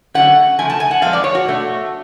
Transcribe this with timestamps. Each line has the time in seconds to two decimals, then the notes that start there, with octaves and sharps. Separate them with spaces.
0.14 D3 F#3 A3 C#4 F#5
0.59 C#3 F3 A3 G#5
0.70 A5
0.80 G#5
0.91 F#5
1.02 F2 F3 G#3 B3 F5
1.13 D5
1.24 C#5
1.35 F#4
1.46 B2 A3 D4